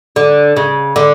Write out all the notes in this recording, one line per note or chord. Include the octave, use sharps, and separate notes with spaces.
D3
C#3
D3